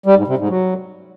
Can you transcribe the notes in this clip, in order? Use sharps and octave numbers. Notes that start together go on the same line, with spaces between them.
G3
G#2
C3
G#2
F#3